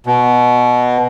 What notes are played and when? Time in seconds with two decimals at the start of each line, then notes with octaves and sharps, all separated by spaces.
0.06 B2